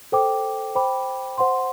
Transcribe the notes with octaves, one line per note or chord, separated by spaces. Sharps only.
A4 C5 G5 D6
C5 G5 B5 D6
C5 F#5 C6